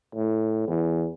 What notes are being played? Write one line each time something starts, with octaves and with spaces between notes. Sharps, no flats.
A2
E2